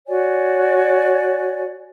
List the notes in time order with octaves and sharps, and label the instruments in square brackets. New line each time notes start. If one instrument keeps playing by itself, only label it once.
[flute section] F#4 C#5 D5 G#5